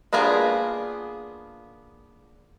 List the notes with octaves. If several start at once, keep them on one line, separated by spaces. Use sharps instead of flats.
A#3 B3 D4 F4 G#4